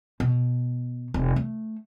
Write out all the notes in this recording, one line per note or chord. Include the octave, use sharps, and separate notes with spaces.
B2
F1
A3